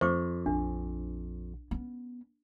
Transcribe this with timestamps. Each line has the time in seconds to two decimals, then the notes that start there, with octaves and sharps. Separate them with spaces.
0.01 F2 C5 C#6 D6
0.46 A#1 D4
1.71 B3 C#4